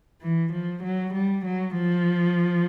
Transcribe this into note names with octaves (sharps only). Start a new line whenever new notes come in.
E3
F3
F#3
G3
F#3
F3